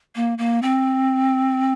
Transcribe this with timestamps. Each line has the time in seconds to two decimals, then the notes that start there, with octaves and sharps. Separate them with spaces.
0.15 A#3
0.38 A#3
0.63 C4